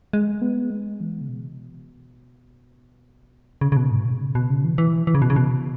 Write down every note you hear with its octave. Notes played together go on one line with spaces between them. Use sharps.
G#3
B3
G#3
E3
C#3
B2
C#3
C#3
B2
G#2
B2
C#3
B2
C#3
E3
E3
E3
C#3
B2
C#3
B2